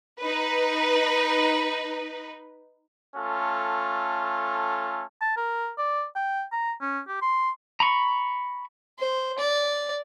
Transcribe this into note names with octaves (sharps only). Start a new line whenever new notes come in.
D#4 B4
A3 C#4 F4 A4
A5
A#4
D5
G5
A#5
C#4
G4
C6
A#5 B5 C#6
C5
D5